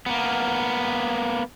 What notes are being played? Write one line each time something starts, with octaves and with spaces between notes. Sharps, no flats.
A#3 B3